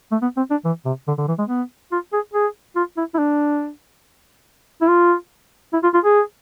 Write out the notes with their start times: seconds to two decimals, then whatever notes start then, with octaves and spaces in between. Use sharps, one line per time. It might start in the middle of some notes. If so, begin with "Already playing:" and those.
0.12 A3
0.22 B3
0.37 C4
0.51 D4
0.65 E3
0.86 C3
1.08 D3
1.18 D3
1.28 E3
1.39 G#3
1.49 B3
1.92 F4
2.13 G#4
2.34 G#4
2.76 F4
2.98 E4
3.15 E4
3.19 D4
4.82 E4
4.88 F4
5.73 E4
5.83 F4
5.94 F4
6.05 G#4